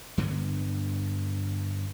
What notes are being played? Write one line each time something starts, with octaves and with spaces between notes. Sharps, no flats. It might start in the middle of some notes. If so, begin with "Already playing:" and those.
G2 D3 F#3 B3